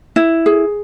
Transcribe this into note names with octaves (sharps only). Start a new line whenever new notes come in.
E4
G#4